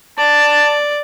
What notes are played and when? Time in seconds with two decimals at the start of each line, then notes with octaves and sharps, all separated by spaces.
0.18 D5 A5